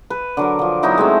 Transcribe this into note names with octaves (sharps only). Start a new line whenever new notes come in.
B4
D3 F#3 A#4
D3 F3
F#3 B3 D#4 E4
G#3 A3 C4